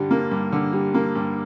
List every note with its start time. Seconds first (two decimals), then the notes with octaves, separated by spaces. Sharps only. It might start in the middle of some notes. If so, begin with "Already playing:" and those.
Already playing: G2 D3 G3
0.11 A#3
0.31 G2
0.52 D3
0.73 G3
0.94 A#3
1.15 G2